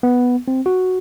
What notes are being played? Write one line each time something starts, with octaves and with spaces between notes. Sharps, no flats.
B3
C4
F#4